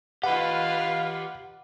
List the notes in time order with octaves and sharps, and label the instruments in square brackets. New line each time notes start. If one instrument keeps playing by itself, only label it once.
[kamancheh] F4 B4 [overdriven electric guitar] G4 D#5 [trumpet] F5 [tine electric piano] F#5